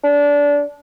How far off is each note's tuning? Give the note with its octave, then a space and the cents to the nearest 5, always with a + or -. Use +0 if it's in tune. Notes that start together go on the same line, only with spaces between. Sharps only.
D4 -25